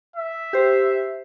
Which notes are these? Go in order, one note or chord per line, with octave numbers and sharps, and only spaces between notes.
E5
G4 C5